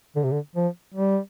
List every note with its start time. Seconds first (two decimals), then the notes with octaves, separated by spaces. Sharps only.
0.16 D3
0.24 C3
0.32 D3
0.56 F3
0.95 G3